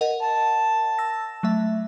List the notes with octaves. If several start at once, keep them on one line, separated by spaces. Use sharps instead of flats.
A#4 D#5 F#5
A5
E6 A#6
F#3 A3 E5